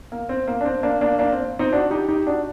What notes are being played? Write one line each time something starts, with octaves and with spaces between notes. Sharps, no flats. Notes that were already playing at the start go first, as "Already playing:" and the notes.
A#3
C4
A#3
D4
C4
A#3 D4
A#3 D4
A#3 D4
C4
C4 D#4
D4 F#4
D#4 G4
D#4 G4
D4 F#4